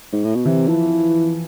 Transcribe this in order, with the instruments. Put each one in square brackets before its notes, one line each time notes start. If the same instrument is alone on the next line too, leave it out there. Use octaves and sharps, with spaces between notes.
[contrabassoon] G#2
A2
B2
[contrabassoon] C3 [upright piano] E3
[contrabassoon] E3 [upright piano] F3